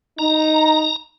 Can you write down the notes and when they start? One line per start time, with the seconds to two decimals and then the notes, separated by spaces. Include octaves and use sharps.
0.19 D#4 A#5